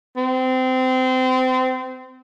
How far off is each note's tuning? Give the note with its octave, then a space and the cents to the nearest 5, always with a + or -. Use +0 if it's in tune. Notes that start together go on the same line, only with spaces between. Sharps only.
C4 -25